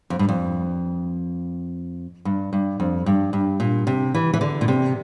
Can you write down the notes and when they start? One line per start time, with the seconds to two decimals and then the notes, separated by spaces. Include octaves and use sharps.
0.10 F2
0.19 G2
0.29 F2
2.25 G2
2.53 G2
2.80 F2
3.06 G2
3.33 G2
3.60 A#2
3.87 C3
4.14 E3
4.34 E3
4.41 D3
4.61 A#2
4.68 C3